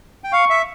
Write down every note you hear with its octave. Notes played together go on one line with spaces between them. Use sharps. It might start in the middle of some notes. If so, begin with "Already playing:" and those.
G5
F5 C#6
E5